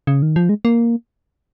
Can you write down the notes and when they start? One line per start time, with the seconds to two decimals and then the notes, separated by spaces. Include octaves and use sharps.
0.07 C#3
0.22 D#3
0.36 F3
0.49 G#3
0.65 A#3